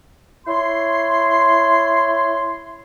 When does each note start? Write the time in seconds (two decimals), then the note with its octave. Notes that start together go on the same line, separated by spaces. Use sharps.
0.47 E4 C#5 C6